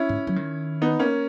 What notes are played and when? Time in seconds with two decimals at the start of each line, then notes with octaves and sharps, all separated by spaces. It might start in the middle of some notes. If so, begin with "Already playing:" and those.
Already playing: C#4 E4
0.09 G#2
0.27 F#3
0.36 D#3
0.82 B3 D#4
0.99 A#3 C#4